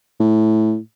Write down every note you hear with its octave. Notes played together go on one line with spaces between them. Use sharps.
A2